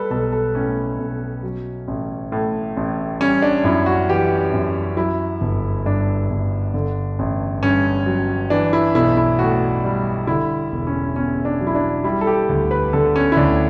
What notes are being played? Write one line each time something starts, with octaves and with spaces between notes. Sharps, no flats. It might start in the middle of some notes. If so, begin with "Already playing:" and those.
Already playing: G3 A4 B4
B1 A4
A4
A2 C#4
B1
F#3
A1
A2
A1
G3 C#4
D4
F#2 E4
F#4
E3 G4
F#2
F#3 E4
G1
G2 D4
G1
D3
A1
G2 C#4
F#3
E3 D4
E4
B1 E4
E4
A2 F#4
G3
D3 E4
E1
C#4
E2 C#4
D4
F#3
E4
D4
G3 E4
A4
G4
D2
B4
D3 A4
C#4
E4
D2 D4